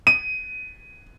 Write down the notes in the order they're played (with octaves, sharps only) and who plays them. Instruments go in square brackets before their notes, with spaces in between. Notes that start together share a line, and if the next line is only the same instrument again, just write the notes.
[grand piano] D#7